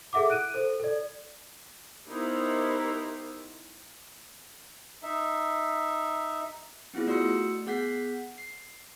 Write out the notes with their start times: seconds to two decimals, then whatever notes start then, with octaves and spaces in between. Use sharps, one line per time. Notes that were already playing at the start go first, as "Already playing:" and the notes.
0.13 G#4 A4 E5 F#5 D6
0.30 F#6 D7 D#7
0.54 A4 C5
0.80 A4 D5
2.07 B3 D#4 E4 G4 A#4 C5
5.03 D#4 E5
6.94 B3 C4 E4 F4 G#4
7.07 A3 F#4 D5 C6 E6 C#7
7.66 B3 G#4 F#5 G6 B6 C7
8.38 C7